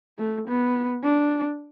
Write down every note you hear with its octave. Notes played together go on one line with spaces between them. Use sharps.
A3
B3
D4